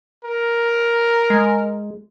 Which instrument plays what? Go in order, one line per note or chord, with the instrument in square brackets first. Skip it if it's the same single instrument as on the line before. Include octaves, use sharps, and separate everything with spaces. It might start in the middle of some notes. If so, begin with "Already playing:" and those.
[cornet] A#4
[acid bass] G#3